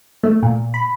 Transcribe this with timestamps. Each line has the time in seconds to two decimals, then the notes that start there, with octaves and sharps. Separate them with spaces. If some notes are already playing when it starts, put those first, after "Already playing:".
0.23 A3
0.43 A#2
0.74 B5